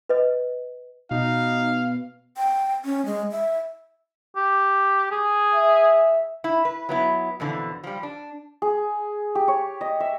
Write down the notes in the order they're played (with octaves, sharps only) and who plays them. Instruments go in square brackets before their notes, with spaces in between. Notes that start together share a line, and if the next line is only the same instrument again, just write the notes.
[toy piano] B4 D#5
[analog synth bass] B2 [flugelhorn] D#4 [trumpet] F5
[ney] G5
C#4
G#3
E5
[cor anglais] G4
G#4
[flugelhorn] E5
[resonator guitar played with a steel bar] E4
B4
F#3 B3 E4
F2 B2 D3 E3
F3 G3
D4
[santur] G#4
G4
C#5
D#5
E5